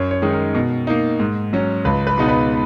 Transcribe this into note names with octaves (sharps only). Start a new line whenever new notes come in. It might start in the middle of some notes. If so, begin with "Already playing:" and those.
Already playing: F#2 C#5
C#5
D#3 G#3 D#4
A#4
B2
A#3 D#4
G#2
F#3 C#4
C#2 B4
B4
B2 G#3 B3 D#4
B4